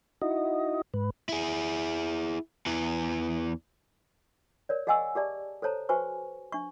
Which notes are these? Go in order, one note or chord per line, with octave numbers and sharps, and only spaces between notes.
D#4 E4 F#4 D#5
G#2 B4
E4 G#4
E2 E3
A#4 C#5 D5
G#4 D#5 F#5 G#5 C#6 E6
G4 G#4 D5 A5
A4 C5 C#5 A5 A#5
F#4 B4 C5 G#5 C#6
D4 C#6